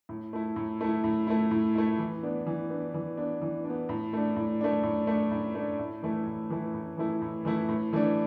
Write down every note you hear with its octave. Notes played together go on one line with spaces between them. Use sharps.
A2
A3 E4
A2
A3 E4
A2
A3 E4
A2
A3 E4
E3
B3 D4
E3
B3 D4
E3
B3 D4
E3
D4
B3
A2
A3 D4
A2
A3 D4
A2
A3 D4
A2
A3 D4
A2
E3 A3 E4
A2
E3 A3 E4
A2
E3 A3 E4
A2
E3 A3 E4
A2
E3 A3 D4